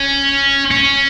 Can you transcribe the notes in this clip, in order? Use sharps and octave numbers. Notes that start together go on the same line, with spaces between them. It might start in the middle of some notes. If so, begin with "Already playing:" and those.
Already playing: C#4
C#4